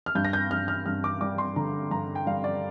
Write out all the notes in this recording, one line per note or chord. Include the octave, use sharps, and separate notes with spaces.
F6
G2 G6
A#6
G6
G2 F6
F6
G2 F6
D6
G3 D6
C6
D3 A#5
G2 A#5
G5
G3 F5
D5